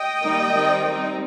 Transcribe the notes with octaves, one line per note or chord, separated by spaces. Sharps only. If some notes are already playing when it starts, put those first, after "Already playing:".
Already playing: D#5 G5
D#3 G3 A#3 D#4
D#3 G3 C4 D#4
G3 C4 D#4